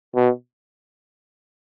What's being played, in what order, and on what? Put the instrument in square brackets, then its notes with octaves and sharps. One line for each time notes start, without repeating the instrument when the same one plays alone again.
[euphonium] B2